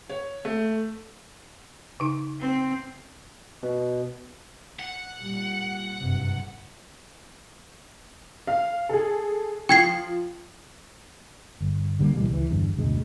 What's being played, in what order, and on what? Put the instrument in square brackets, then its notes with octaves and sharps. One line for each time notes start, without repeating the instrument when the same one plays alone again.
[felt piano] C#5
A3
[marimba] C#3 D#4
[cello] C4
[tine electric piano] B2
[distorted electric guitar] F#5
[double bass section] A#2 G3
F#1 G2 C3
[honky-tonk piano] F5
G#4 A4
[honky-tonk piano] F3 [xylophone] G5 G#6 C7
[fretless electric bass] G1
D3 G3 A3 A#3
D1 B2 E3 G3
C#2 E3
G1 E2 G2
F#1 D2 B2 G#3